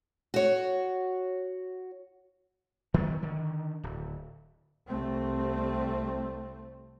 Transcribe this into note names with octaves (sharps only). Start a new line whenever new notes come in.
F#4 C#5
D#3 F#3 G3 B3
D3 D#3
D1
C2 A3 C4